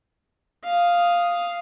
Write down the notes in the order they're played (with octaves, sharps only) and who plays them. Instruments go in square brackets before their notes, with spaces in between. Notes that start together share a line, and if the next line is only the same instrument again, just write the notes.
[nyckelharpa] F5 D#6